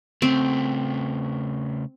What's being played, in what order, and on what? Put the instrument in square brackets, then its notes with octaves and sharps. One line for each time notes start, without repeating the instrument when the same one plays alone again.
[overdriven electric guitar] C#3 A3 [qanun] C4